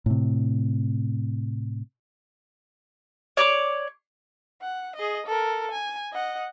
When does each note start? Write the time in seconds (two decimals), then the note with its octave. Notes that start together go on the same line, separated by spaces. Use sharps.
0.06 A2 C3
3.37 C#5 D5 D6
4.62 F#5
4.96 G#4 D#5
5.26 A4 A#4
5.71 G#5
6.13 D#5 F#5